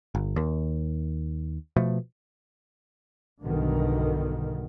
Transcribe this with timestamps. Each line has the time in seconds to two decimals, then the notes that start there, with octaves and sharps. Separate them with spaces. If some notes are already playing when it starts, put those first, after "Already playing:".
0.15 G1
0.36 D#2
1.76 B2 F3 A3
3.40 B1 G2 B2 D3 D#3